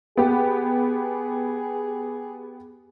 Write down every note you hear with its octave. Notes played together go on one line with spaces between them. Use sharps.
B3 G4 G#4